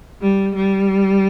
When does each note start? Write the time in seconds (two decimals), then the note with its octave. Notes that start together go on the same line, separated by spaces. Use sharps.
0.21 G3
0.55 G3